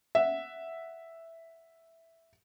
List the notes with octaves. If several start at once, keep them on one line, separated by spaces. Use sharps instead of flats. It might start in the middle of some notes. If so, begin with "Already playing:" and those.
E5 F#5